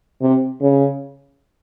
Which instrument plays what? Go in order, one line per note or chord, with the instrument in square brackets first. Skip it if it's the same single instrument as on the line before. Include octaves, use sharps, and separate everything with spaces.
[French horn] C3
C#3